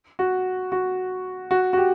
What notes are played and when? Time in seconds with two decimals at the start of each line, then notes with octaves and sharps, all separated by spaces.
0.19 F#4
0.72 F#4
1.51 F#4
1.73 F#4
1.77 G4